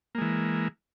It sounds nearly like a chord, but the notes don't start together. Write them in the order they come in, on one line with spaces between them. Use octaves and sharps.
A#3 G#3 E3